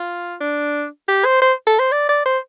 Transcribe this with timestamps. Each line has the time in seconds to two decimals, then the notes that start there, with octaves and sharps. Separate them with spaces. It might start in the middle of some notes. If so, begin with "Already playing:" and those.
Already playing: F4
0.41 D4
1.08 G4
1.25 C5
1.42 C5
1.67 A4
1.79 C5
1.92 D5
2.09 D5
2.25 C5